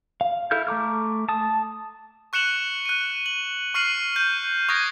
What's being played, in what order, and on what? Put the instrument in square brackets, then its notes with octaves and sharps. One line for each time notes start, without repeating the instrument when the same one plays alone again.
[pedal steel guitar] F5
E4 A4 F6 G6
A3 A#5 D6 F6
A5 D#6
[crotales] C#6 F#6 C#7 E7 F#7
F#6 D#7
F#7
C#6 F6 C7 D#7 F#7
G6
C#6 D#6 F#6 G#6 A#6 D7